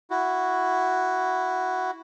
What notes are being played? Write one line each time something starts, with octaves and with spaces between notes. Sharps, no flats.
E4 F#4